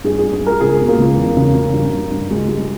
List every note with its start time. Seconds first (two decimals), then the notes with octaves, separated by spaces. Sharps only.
0.04 G2 G#4
0.18 G2 G#4
0.33 G#4
0.41 G2
0.47 A#4
0.60 C#2 G#4
0.80 B2
0.88 A#3
0.98 C#2
1.17 E2
1.37 C#3
1.55 C#3
1.74 G2
1.93 G2
2.12 G2
2.30 C#2 G#3
2.49 G3 G#3